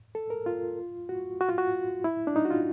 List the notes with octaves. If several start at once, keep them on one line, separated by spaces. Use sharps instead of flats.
A4
A#4
F4
F#4
F#4
F4
F#4
E4
D4
D#4
F#4
F4